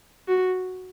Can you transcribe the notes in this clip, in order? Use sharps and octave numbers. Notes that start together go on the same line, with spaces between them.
F#4